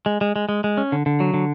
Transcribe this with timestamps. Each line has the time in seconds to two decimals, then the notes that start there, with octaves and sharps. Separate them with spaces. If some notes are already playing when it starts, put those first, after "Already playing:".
0.06 G#3
0.21 G#3
0.36 G#3
0.49 G#3
0.64 G#3
0.77 C#4
0.92 D3
1.06 D3
1.20 F#3
1.34 D3